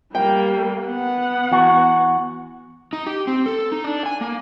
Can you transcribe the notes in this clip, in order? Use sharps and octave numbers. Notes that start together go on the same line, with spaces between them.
G3 A#3 G5
B3 F#5
E2 F#4
D#4
G4
C4
A4
D#4
D4
G#5
A#3